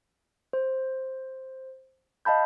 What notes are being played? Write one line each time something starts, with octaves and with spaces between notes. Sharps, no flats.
C5
D#5 F5 A5 B5 G6